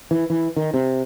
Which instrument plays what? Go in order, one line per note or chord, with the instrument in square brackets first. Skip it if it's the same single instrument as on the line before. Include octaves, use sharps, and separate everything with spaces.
[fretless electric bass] E3
E3
D#3
C3